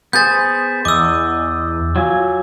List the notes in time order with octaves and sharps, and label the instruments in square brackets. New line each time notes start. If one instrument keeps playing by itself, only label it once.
[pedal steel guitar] B3 G#4 C5 [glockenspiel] G6 A6
[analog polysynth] E2 [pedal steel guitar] D#5 [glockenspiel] D6 E6
[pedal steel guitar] F#3 F4 G#5